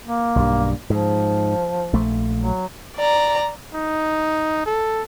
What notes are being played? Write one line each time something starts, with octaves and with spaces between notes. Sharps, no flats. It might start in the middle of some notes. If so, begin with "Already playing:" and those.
A#3
B1 G2
G#2 F3
A#1 A3
F#3
D5 A#5
D#4
A4